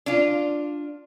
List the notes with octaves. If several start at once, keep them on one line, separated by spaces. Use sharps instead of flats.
D4 F4